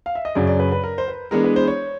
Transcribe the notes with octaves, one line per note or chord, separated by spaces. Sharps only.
F5
E5
D#5
F#2 C#3 F#3 D5
D5
B4
B4
A#4
C5
B4
E3 G#3 B3 D4 A#4
B4
C5
C#5